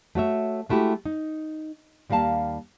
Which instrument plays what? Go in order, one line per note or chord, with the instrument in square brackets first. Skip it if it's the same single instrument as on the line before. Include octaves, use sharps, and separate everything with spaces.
[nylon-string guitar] A3 F#4 C#5 E5
G#3 A3 E4 F#4 G4
D#4
D#2 G3 A#3 F5 A5